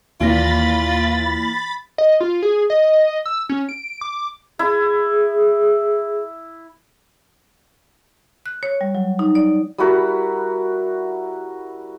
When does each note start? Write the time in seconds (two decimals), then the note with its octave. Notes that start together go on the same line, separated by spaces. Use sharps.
0.21 D#2 A#2 E3 F4 B5 A6 A#6
1.98 D#5
2.20 F4
2.42 G#4
2.70 D#5
3.26 E6
3.49 C#4
3.69 D7
4.01 D6
4.59 E4 G#4
8.46 F#6
8.63 C#5
8.81 G3
8.95 F#3
9.19 D#4
9.35 D5
9.78 G3 E4 F#4 A#4